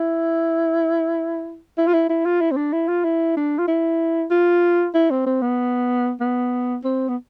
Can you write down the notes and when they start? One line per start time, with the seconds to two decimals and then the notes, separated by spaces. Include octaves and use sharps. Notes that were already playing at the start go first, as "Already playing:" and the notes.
Already playing: E4
1.78 E4
1.87 F4
1.93 E4
2.09 E4
2.25 F4
2.41 E4
2.51 C4
2.57 D4
2.73 E4
2.88 F4
3.04 E4
3.37 D4
3.58 F4
3.68 E4
4.31 F4
4.94 E4
5.10 C4
5.26 C4
5.42 B3
6.20 B3
6.84 C4
7.08 B3